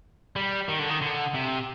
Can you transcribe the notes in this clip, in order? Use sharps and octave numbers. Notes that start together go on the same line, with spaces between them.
G3
D#3
D3
D#3
D3
C3